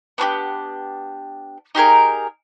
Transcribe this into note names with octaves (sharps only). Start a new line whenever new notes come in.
B3 D4 F#4 G4
D#4 G4 G#4 A#4